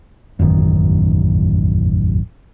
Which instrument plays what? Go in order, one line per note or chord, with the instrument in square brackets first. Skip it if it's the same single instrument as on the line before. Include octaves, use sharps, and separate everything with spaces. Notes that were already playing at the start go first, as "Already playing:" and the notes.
[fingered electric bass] E1 A1 F#2 D#3